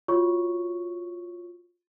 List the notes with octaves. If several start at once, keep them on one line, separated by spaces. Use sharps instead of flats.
F4 F#4 C#5 C#6